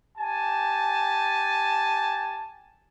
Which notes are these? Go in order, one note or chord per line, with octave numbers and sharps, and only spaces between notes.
G4 G#5 A5